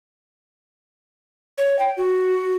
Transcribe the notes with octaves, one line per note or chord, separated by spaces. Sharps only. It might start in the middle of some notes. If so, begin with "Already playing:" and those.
C#5
G5
F#4